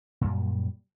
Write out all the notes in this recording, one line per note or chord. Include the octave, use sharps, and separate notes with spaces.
F#2 A#2 G3